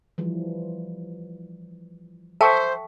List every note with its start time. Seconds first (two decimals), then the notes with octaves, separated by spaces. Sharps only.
0.18 E3 F3 G3
2.41 A4 C5 E5 G5 A5 C#6